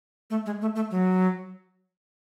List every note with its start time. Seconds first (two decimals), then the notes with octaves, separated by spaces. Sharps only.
0.30 A3
0.46 G#3
0.61 A3
0.76 A3
0.91 F#3